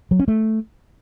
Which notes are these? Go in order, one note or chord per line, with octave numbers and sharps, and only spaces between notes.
F#3
C#4
A3